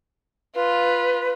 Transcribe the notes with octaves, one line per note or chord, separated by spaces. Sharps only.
F4 B4